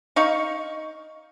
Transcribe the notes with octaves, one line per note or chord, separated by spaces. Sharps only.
D#4 F5 C#6